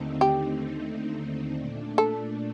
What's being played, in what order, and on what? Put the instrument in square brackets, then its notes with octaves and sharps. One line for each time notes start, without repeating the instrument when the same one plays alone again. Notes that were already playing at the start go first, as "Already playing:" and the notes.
Already playing: [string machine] D#2 D3 A3 C4 D#4
[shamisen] G4
[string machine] A#2 A3 D4
[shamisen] A4